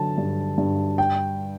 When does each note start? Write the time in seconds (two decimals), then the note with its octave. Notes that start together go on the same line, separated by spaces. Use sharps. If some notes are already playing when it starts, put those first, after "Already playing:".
Already playing: D3 F#3 A5
0.18 G2
0.58 G2
0.98 G5